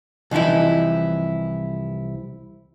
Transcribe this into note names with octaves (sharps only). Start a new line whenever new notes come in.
C2 E3 F3 D#4 E4